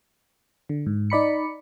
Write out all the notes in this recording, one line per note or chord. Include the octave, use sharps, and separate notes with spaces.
D3
G#2
D#4 D5 B5 C#7